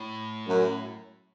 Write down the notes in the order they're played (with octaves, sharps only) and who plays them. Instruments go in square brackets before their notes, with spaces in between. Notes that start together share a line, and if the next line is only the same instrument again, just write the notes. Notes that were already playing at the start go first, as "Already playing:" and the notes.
Already playing: [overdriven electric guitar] A2
[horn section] F#2